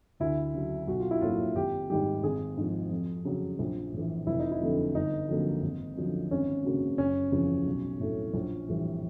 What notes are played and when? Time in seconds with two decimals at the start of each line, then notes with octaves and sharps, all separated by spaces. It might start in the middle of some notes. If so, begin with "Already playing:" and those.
0.20 D2 E4
0.54 C#3 F#3
0.87 B1 F#4
1.00 F4
1.11 E4
1.21 A2 F#3 A#3 F4
1.55 G#1 G4
1.90 G#2 D#3 G3 G4
2.23 G#1 G#4
2.57 G#2 F3
2.91 F2
3.25 C#3 F#3
3.59 A#1
3.93 A2 E3
4.27 F1 E4
4.39 D#4
4.51 E4
4.62 F2 D3 F#3 A3
4.95 G1 D#4
5.29 F2 D3 F#3 A#3
5.62 G#1
5.97 F#2 D3 F3
6.31 G#1 C#4
6.64 F#2 C#3 F#3 A#3
6.98 F#1 C#4
7.32 E2 C#3 F3
7.66 B1
8.00 A2 F#3 A3
8.34 A#1
8.69 A2 E3 G3